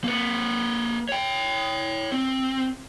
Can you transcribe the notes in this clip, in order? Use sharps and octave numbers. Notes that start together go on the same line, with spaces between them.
A#3 B4
C#5 G5
C4